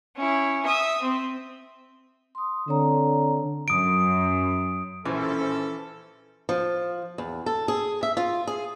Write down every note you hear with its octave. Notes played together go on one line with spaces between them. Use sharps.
C#4 E4
E5 D#6
C4
C6 D#6
D3 C4 C#5 A#5
F#2 D#6 D7
A#1 E3 C#4 A4 C5
F3
E2
A4
G#4
E5
F4
G#4